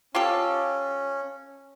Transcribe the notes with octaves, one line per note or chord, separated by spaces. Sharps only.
C#4 F4 G4 A4